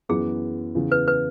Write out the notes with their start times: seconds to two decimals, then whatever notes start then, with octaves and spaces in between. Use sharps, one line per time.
0.09 F#2 E3 B3 G#4
0.75 E2 C#3 E3
0.92 B4
1.08 B4